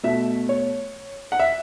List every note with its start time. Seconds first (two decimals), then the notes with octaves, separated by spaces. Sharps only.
0.03 B2 A3 E5
0.49 C#5
1.32 F#5
1.39 E5